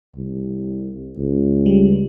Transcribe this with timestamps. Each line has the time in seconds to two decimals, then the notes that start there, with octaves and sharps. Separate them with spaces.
0.16 C2
1.17 C#2
1.66 G3